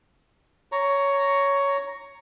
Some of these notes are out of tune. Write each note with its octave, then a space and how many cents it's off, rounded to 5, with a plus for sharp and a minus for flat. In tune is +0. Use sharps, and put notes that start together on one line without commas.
C#5 +10 A#5 +0